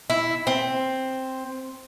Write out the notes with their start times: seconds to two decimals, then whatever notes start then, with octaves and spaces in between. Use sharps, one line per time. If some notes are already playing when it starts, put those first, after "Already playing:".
0.10 E4
0.47 C4